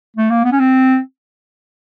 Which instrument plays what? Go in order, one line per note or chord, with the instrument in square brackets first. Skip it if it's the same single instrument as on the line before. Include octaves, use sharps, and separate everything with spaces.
[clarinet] A3
A#3
B3
C#4
C4